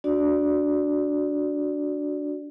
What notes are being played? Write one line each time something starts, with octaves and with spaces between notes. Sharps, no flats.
D4 F#4 D5